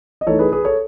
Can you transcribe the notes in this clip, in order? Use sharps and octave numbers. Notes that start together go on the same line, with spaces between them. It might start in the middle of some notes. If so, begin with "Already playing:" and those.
D#5
E3 A3 D#4 A4 C#5
G#4 B4
G#4 B4
A4 C#5